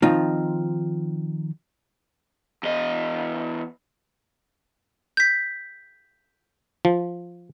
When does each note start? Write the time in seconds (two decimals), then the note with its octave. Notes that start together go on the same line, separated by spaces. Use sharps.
0.02 D#3 F3 C4 D#4 F4
2.63 E2 D#5
5.17 G6 B6
6.85 F3